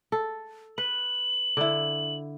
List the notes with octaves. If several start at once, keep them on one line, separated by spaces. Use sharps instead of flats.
A4
B4 F#7
D3 E4